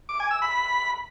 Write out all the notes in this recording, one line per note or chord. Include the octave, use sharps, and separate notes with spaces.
D6
G#5
E6
B5